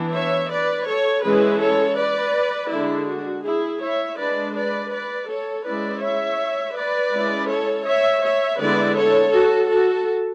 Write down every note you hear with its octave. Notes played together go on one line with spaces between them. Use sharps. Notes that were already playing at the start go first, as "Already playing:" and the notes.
Already playing: E3 B3 D4
C#5 E5
B4 D5
A4 C#5
E3 G#3 C#4 E4 G#4 B4
A4 C#5
B4 D5
D3 G#3 D4 E4
F#4
E4 G#4
C#5 E5
G#3 D4 B4 D5
B4 D5
B4 D5
A4 C#5
G#3 C#4 E4 B4 D5
C#5 E5
B4 D5
G#3 C#4 E4
A4 C#5
C#5 E5
C#5 E5
D3 G#3 B3 E4 B4 D5
A4 C#5
F#4 A4
F#4 A4